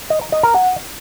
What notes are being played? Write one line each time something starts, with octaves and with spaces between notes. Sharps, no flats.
D#5
A#5
D#5
A#4
F#5